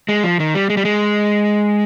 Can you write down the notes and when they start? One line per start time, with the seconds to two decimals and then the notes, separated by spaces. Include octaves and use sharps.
0.09 G#3
0.23 F3
0.40 D#3
0.55 G3
0.70 G#3
0.77 G3
0.85 G#3